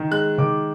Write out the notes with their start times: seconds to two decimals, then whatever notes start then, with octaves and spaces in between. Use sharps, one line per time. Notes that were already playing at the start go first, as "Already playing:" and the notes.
Already playing: D#3
0.11 G#3 F#6
0.38 D#3 D6